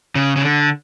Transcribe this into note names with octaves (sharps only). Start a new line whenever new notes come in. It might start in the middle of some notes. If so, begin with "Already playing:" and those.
C#3
C#3
D3